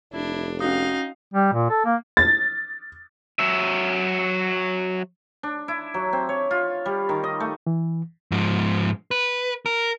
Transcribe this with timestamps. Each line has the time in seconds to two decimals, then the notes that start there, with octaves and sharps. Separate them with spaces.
0.13 F1 D4 E4
0.60 C#4 D#4 F#4 F5 D#6
1.34 G3
1.52 A#2
1.70 A4
1.85 A#3
2.17 A6
3.39 F#3 E5
5.43 D4
5.68 E4
5.94 F#3
6.13 C4
6.29 C#5
6.51 F4
6.86 G3
7.09 D#3
7.24 D#5
7.40 A3
7.67 E3
8.32 G#2 F3
9.11 B4
9.66 A#4